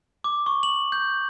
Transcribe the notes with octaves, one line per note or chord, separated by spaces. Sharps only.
D6
C#6
F#7
G6